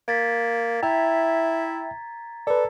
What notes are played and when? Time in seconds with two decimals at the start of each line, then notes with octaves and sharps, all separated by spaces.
0.08 A#3 G#6 A6 B6
0.83 E4 E5 G5 A#5
2.47 A4 B4 D5